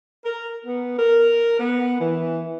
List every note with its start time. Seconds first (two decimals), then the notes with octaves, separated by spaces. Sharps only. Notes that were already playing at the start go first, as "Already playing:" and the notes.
0.25 A#4
0.65 B3
0.98 A#4
1.59 B3
2.00 E3